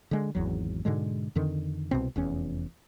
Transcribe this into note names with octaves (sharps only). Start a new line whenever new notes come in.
D3 G#3
G#1 E2 F#3
G#2 B2 D3 G#3
F2 D3 D#3
C2 B2 C4
F1 E2 C#4